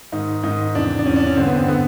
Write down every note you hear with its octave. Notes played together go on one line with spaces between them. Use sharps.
G#2 D#3 D#4
G#2 D#3 D#4
E2 C3 E3 D4
D4
E2 C3 E3 C#4
D4
C#4
G2 D3 C4
B3
C4
D3 B3